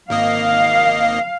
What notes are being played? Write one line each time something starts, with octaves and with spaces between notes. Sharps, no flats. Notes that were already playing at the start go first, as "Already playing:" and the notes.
G#1 A#3 D#5 F5